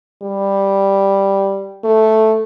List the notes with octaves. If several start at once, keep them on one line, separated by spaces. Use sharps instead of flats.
G3
A3